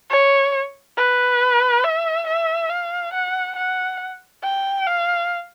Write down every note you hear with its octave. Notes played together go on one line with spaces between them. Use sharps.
C#5
B4
E5
E5
F5
F#5
F#5
G5
F5